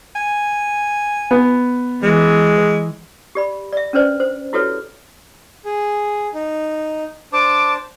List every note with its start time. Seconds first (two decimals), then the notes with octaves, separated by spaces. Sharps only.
0.15 G#5
1.31 B3
2.03 E3 G#3
3.35 G4 D5 B5
3.72 D5 E5
3.93 C#4 D4 B4 C5 D5
4.20 C5
4.53 E4 F#4 G4 A4 B4 C#5
5.65 G#4
6.34 D#4
7.33 D4 C5 A5 D6